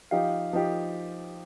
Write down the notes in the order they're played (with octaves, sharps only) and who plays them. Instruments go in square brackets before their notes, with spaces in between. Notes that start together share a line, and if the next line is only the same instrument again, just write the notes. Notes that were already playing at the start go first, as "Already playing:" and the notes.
[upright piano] F3 D#4 G4 [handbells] F5
[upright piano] F3 D#4 G4